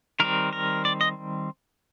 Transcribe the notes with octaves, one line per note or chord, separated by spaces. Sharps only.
D#3 G3 C4 A#4
A#4
D5
D#5